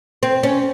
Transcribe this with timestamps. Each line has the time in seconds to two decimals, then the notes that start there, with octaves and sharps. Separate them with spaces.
0.23 C4
0.43 C#4